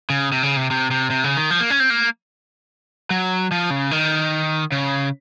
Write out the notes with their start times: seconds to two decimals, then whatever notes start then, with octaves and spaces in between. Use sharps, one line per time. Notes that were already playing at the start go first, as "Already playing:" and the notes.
0.10 C#3
0.32 C3
0.43 C#3
0.57 C3
0.71 C3
0.91 C3
1.10 C3
1.24 C#3
1.37 D#3
1.51 F3
1.60 A#3
1.70 C#4
1.80 C4
1.90 A#3
3.10 F#3
3.51 F3
3.70 C#3
3.91 D#3
4.72 C#3